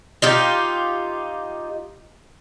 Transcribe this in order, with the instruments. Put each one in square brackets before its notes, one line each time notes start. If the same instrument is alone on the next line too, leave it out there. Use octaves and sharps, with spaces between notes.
[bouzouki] D#4 F4 G4